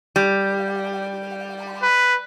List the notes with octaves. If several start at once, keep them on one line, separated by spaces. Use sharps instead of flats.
G3
B4